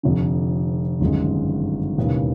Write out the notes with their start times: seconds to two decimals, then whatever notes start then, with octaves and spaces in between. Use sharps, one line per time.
0.03 F1 F2 D3
1.00 G1 F#2 D#3 G#3
1.98 E1 D#2 C#3 E3